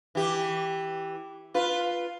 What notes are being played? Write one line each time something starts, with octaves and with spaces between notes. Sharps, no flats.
E3 G4
F4 B4